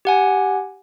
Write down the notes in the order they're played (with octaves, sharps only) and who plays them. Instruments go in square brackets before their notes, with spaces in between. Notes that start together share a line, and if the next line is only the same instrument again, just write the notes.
[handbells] G4 F#5 G#5